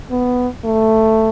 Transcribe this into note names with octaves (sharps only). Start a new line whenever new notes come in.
B3
A3